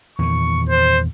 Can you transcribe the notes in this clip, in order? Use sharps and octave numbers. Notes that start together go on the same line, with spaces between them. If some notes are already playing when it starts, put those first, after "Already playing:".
E2 A#2 D#3 C#6
C5